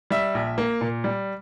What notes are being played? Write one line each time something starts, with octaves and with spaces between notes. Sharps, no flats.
G3 E5
A#1
A#3
A#2
G3